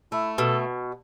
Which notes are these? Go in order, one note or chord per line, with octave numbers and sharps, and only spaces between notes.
A3 E4
B2 A4